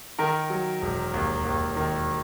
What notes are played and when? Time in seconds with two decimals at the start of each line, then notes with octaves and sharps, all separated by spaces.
0.19 D#3 A#4
0.50 F#3
0.82 E1
1.14 D#2
1.45 D#2
1.76 D#3